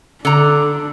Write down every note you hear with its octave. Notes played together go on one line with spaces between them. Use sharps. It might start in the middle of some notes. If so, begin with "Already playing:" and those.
D3 D4 A#5